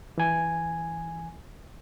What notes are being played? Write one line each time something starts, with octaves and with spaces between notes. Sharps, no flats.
E3 G#5